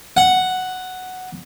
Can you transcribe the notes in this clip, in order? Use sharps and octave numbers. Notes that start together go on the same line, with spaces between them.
F#5